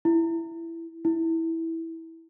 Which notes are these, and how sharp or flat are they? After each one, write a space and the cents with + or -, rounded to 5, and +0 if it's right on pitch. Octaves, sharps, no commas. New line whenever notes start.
E4 +10
E4 -10